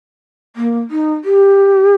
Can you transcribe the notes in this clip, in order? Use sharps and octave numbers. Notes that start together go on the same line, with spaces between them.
A#3
D#4
G4